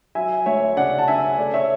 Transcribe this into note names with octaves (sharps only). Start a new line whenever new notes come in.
F#3 E5 G#5
D2 C#5 E5
C#3 D5 F#5
A5
C#4 E5 G#5
A3 D5
C#5 E5